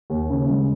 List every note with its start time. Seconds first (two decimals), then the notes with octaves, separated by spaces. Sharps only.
0.10 D#2
0.30 C#3
0.50 G#3